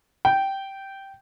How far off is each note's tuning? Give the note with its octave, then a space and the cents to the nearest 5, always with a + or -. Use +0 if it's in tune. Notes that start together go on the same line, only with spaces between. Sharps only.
G5 -10